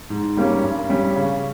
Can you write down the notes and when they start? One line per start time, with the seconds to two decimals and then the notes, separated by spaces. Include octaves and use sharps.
0.10 G#2
0.37 G3 A#3 C#4
0.64 G2
0.89 G3 C#4
1.16 C#3